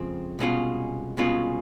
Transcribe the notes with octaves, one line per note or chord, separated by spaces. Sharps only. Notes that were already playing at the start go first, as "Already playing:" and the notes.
Already playing: F2 C#3 F3 G#3 C4
C2 B2 G#3 C#4 F4
C2 B2 G#3 C#4 F4